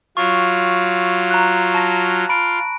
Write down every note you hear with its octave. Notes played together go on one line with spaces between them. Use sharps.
F#3 F4 C#6
A#5 F#6
A5 A#6
F4 B5 D7